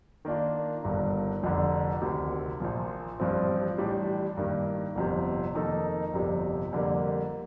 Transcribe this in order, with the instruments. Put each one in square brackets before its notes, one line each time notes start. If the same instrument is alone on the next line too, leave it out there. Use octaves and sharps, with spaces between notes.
[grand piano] D#3 A#3 D4 F4
G1 G2 D#3
F1 F2 D3
D2 C3 D#3
A#1 A#2 F3
A1 G2 F3 C4 F4
A1 A2 G3 D4
G2 D#3 A#3
G1 F2 C3
F2 D#3 A#3 D#4 A4
G1 F2 C3 G3
F2 D3 G3 A#3